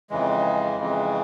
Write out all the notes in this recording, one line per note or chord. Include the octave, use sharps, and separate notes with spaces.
F2 C#3 E3 G#3
F2 C#3 E3 G#3